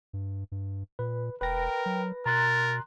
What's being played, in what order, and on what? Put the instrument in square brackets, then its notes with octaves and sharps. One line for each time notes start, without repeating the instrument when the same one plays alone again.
[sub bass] G2
G2
[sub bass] A#2 [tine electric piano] B4
[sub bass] E1 [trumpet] A#4 [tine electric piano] B4 A#6 [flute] G5
[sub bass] F#3
[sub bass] B2 [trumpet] A#4 [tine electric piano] A#5 C6 F#6 [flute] A6